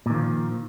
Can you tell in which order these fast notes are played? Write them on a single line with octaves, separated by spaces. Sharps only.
A#2 D#3 F3